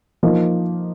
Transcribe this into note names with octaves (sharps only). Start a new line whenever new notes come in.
F3 A#3 D#4 A#4